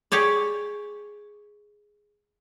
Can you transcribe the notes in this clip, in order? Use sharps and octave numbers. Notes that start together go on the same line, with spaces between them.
G4 G#4 C#5 D5